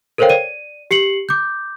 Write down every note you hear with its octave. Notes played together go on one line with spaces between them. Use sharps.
A4 A#4 C5 C#5 F5 G5
D5 D#7
G4 C7 C#7 F#7
D6 G6